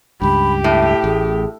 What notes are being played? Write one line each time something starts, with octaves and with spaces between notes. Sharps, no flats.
C#2 G2 G4 B5
A2 E5
A1 G#4